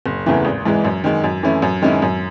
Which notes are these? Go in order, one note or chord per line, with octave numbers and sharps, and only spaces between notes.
F#1
E2 C#3 E3 A3
G#1
G#2 E3 G#3
F#2
D#3 G#3
F#2
E3 A3 C#4 E4
F#2
D#3 G#3 C#4 E4
F#2